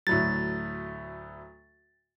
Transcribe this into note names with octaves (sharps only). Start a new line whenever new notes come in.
D2 A2 F#3 A6